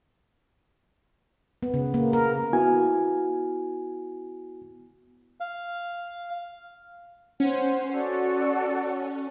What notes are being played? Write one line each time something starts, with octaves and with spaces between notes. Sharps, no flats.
B3
C#3
A#3
A#4
B3 E4 F#4 G#5
F5
C#4 C5 F#5
F#4 A4 D5